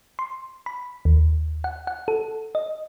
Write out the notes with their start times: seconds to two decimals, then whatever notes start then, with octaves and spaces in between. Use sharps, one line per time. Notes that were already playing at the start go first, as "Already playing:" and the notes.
0.19 C6
0.66 B5
1.05 D#2
1.64 F#5
1.87 F#5
2.08 A4
2.55 D#5